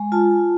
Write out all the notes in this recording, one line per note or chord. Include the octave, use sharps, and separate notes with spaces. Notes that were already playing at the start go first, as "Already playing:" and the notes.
Already playing: G#3
F4 A5